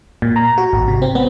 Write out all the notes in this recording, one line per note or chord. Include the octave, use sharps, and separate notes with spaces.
A#2
A#5
F#4
G#1
C3
C4
B3